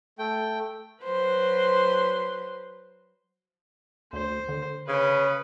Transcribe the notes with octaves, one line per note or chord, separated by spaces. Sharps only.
A3 G5
F#3 B4 C5 C6
D2 C5
D3
C#3 B4